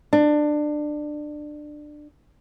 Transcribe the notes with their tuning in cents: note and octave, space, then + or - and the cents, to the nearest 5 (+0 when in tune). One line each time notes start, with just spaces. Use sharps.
D4 +20